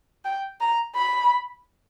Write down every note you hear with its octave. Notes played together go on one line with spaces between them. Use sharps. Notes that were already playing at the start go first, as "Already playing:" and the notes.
G5
A#5
B5